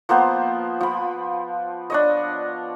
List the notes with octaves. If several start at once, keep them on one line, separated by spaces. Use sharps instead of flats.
F3 A#3 B3 C5
F3 B5
D4 C#5 D#5